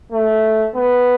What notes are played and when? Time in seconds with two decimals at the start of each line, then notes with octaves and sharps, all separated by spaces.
0.12 A3
0.76 B3